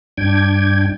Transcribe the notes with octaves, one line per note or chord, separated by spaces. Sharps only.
G2 D4 G5 G#6